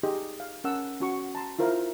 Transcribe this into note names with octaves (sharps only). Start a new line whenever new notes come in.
D#4 G4 G#4 D#5
F5
C#4 A#4 F#5 A5 E6
C#4 F#4 C#6
A5 A#5 C6
E4 F4 A#4 C5 F5